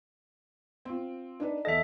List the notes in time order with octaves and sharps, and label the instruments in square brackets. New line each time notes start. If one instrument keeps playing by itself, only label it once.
[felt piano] C4 F4
D4 D#4 B4
[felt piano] E2 A4 [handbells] D#5 E5